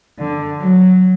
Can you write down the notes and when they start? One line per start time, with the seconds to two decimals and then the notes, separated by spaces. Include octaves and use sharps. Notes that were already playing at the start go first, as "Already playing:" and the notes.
0.20 D3
0.61 F#3